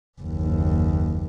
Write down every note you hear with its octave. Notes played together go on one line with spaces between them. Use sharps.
F#1 D#2